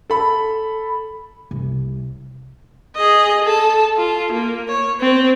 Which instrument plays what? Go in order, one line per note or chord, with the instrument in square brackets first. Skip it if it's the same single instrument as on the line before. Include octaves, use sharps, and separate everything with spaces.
[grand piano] A4 B5
[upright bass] C2
[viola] G#4 D#5
A4 A5
F4
A#3
C#5
C4